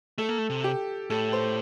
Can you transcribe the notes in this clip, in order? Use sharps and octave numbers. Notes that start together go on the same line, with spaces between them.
A3 A4
A#3
A3
C3
G4
A2 A4
C5